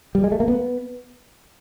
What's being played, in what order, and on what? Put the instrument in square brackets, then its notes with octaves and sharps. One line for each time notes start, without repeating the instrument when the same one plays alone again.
[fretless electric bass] G3
G#3
A3
A#3
B3